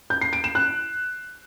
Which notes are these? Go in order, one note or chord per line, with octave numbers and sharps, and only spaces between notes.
G6
C7
D7
E7
F#6